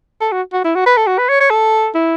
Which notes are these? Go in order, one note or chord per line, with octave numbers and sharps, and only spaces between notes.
A4
F#4
F#4
E4
F#4
B4
A4
F#4
B4
C#5
C#5
A4
E4